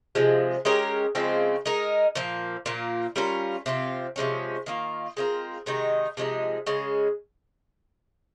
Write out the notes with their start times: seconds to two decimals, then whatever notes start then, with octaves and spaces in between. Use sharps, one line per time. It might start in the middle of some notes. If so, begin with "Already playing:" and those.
0.15 C3 F3 G#3
0.65 G#3 C#4 G4 A#4
1.15 C#3 F3 G#3 C4
1.66 G#3 D#4 A#4
2.15 A#2 F3 A#3
2.66 A#2 F3 A#3
3.16 G3 C#4 F4 A#4
3.66 C3 F3 C4 F4
4.16 C3 F3 G#3 C#4
4.66 D#3 A#3 F4
5.17 G#3 C4 F4 A#4
5.66 C3 D#3 G#3 D#4
6.17 C3 F3 G#3 D#4
6.66 C#3 G#3 C#4